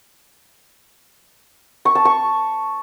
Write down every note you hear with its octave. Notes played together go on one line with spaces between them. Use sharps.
C#6
A5
C#6